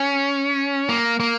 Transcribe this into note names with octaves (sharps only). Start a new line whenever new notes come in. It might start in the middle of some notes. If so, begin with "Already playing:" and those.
Already playing: C#4
A#3
A#3